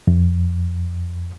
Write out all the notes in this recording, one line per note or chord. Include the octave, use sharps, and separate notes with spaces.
F2